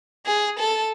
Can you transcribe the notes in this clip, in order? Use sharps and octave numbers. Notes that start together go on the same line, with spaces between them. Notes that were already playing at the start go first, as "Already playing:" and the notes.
G#4
A4